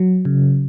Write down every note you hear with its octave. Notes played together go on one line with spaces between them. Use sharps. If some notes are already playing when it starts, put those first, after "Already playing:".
Already playing: F#3
C#3